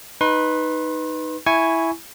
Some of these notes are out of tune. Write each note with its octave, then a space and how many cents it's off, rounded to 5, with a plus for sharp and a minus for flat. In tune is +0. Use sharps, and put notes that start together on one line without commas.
D#4 +0 B4 +0 C6 +40
E4 +0 G#5 +0 C#6 +0